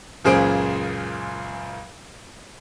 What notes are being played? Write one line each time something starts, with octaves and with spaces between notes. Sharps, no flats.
C#2 F#2 A#2 G#4 C5 D7